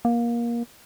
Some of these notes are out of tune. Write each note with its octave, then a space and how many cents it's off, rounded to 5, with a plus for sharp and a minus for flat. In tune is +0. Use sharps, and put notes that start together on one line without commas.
A#3 +20